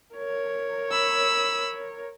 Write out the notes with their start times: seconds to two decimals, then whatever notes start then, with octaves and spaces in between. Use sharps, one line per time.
0.14 A#4 C#5
0.92 B5 E6